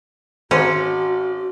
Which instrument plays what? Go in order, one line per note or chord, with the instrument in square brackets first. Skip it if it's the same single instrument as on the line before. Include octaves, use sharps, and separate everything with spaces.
[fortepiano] G#1 C5 [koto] C#4 [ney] F#4